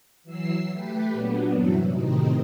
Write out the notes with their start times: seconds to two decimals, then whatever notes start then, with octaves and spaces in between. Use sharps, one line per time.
0.24 E3 F#3 E6 C7
0.72 A3 G4 B4
1.13 A#2 F#3 B3 D4
1.51 G2 C3 E3 F#3 E4 F#4
1.89 A2 C3 D#3 C4 D#4